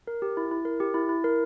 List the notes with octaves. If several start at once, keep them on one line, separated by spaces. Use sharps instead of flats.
A#4
G4
E4
E4
A#4
G4
E4
E4
A#4